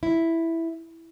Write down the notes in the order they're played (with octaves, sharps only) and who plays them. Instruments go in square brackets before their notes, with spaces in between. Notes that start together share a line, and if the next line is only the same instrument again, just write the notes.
[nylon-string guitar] E4